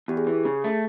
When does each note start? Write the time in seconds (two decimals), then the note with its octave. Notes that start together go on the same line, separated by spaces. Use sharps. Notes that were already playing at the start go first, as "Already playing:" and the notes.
0.08 E2 G4
0.17 G#4
0.27 E3
0.45 C#3
0.64 A3